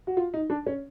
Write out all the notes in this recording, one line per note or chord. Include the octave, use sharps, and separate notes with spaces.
F#4
F4
D#4
D4
C#4